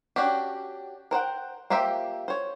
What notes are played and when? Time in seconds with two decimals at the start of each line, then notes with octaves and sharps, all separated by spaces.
0.16 C#4 D4 F#4 G4
1.11 A#4 C5 F#5 G5
1.70 A#3 F4 G4 C5 E5
2.28 C5 C#5